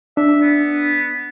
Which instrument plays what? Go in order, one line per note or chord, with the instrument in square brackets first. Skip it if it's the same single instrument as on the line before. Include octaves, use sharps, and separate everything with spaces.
[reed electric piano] D4 [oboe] E5
[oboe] B3